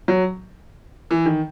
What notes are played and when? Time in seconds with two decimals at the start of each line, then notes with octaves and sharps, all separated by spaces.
0.08 F#3
1.11 E3
1.26 D#3